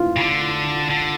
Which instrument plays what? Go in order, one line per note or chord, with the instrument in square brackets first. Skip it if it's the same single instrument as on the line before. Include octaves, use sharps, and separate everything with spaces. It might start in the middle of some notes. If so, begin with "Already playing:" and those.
Already playing: [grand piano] F4
[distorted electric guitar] C#3
D3
D3